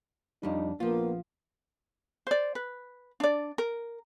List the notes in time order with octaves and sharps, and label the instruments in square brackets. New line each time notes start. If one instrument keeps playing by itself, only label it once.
[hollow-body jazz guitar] F2 G3 [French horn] D4 [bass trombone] D#4
[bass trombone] A#1 [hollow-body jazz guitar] F3 F4 [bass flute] A#3 [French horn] B3
[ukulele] C5 D5
B4
D4 D5
A#4